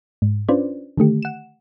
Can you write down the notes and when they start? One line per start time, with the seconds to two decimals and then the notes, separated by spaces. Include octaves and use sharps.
0.22 G#2
0.49 C#4 D4 F4 B4 C5 D5
0.97 D3 D#3 A3 G4
1.22 F#5 E7